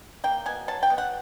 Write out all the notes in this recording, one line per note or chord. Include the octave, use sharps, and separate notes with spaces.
A#3 G5
B2 G#5
F#3 A5
G5
B2
F#5